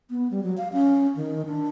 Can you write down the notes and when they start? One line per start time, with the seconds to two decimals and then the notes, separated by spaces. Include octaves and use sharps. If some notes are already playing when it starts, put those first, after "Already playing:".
0.10 B3
0.31 G3
0.43 F#3
0.57 F5
0.73 C#4
1.16 D#3
1.46 D4